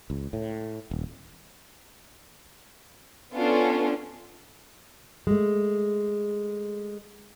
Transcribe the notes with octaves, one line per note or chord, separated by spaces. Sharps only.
C#2
A2
D#1
B3 C#4 D4 F4 A4
G#3 A3